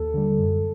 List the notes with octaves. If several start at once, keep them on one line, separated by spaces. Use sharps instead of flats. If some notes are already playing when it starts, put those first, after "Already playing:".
Already playing: D#2 A4
D3 G3
F#2